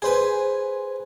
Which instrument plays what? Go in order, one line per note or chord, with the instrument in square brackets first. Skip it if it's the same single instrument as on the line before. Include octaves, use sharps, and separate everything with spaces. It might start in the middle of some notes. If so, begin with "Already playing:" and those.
[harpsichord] G#4 B4 [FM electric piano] C5 G#5